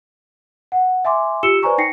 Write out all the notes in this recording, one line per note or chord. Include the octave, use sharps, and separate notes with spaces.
F#5
E5 G#5 C6 D6
F4 G4 E6 C#7 E7 G7
B4 C5 D5 G#5 A#5 C#6
D#4 G5 A#6 C7 C#7